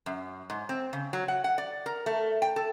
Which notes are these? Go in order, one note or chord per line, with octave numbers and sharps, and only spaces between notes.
F#2
G#2
C4
C#3
F#3
F#5
F#5
D5
A#4
A3
G5
A4